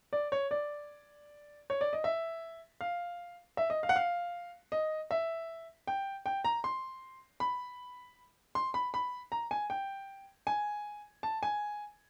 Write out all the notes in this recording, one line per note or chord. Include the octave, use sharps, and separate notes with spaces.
D5
C#5
D5
C#5
D5
D#5
E5
F5
E5
D#5
F5
F#5
F5
D#5
E5
G5
G5
A#5
C6
B5
C6
B5
B5
A#5
G#5
G5
G#5
A5
G#5